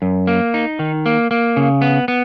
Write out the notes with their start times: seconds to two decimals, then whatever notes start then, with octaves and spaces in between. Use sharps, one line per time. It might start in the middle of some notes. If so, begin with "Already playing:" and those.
0.02 F#2
0.27 A#3
0.54 D#4
0.79 D#3
1.06 A#3
1.31 A#3
1.56 C#3
1.82 B3
2.08 B3